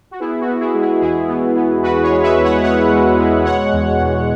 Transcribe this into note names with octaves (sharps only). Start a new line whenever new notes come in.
F#4
B3 E4 G#4
F#4
B3
E4 G#4
G#3
E4 G#4
E2 E4 G#4
B3
B3
E2 F#4 B4
G#4 C#5
G#3
B4 E5
E2
C#5 F#5
B3 C#5 F#5
G#3
G#3
B2 C#5 F#5
E2
E2